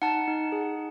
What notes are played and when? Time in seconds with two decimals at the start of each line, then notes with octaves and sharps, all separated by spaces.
0.02 D#4 F#5 A5
0.28 D#4
0.52 G#4